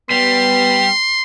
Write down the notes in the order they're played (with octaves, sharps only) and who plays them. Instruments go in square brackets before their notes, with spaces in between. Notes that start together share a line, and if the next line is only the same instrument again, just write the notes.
[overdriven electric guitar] G3 [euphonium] B3 [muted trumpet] C6